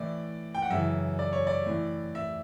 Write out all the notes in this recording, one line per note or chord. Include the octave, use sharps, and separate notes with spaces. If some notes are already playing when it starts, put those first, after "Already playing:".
Already playing: A2 E3 D5
G5
F#5
F#2 C#3 E3 E5
D5
C#5
D5
A2 E3
E5